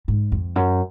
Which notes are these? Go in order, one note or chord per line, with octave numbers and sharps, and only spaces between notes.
G#2
F2
F#2